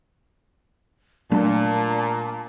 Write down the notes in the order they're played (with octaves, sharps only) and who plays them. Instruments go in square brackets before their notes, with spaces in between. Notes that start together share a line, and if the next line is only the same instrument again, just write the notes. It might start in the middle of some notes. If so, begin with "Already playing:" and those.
[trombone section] A#2 [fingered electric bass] F#3 A3 D4 [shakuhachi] A5